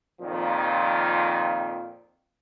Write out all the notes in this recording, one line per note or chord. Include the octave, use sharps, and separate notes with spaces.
F2 A#2 D#3 F3